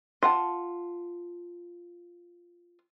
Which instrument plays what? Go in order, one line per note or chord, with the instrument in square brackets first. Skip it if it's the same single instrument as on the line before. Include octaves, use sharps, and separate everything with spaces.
[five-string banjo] F4 F#5 A5